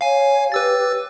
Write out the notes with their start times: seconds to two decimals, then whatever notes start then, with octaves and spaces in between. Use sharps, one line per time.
0.01 C#5 F5 G#5
0.52 G4 B4 E6 A6